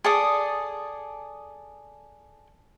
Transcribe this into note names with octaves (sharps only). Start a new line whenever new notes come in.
G#4 A4 D5 D#6